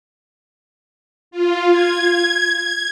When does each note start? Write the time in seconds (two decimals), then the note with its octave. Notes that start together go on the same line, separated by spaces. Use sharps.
1.31 F4
1.70 G#6
2.57 G#6